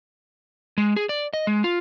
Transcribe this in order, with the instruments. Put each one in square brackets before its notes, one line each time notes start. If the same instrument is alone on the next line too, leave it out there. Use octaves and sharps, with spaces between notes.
[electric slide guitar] G#3
G#4
D5
D#5
G#3
F4